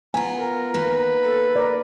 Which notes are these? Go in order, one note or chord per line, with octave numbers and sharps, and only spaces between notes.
B3 F4 G#5 A#5
A#4
D#3 A#3 B4
A4
A#4 D5